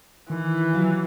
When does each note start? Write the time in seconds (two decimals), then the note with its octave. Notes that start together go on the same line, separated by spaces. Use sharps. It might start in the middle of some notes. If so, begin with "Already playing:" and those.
0.30 D#3 E3
0.73 F#3 F4